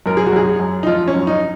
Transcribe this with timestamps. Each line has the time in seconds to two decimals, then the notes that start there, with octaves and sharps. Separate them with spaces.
0.06 F#2 A#4
0.17 G#4
0.26 F#4
0.33 F#2 G#4
0.60 F#2
0.83 D#4
0.87 F3 F4
1.08 C#4
1.14 F#2
1.27 D#4